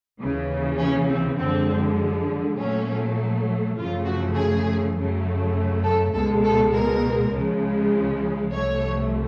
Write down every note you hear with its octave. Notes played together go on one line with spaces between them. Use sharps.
D#2 C#3 E3
C#4
C4
F#2 D3 F3 G#3 C4
A#2 F#3 A3 C#4
F#2 C#3 F3 A3 F4
F#4
G#4
F#2 C#3 F#3 A3
A4
C#2 B2 G#3 A4
A4
A#4
C#2 C#3 F3 G#3
C2 C3 F3 A3 C#5